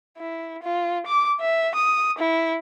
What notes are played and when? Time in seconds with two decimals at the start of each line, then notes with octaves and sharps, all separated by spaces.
0.18 E4
0.62 F4
1.06 D6
1.40 E5
1.75 D#6
2.18 E4